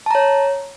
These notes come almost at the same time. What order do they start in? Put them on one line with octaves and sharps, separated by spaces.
A5 A#5 C#5